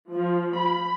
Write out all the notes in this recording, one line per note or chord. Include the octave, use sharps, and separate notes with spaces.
F3
B5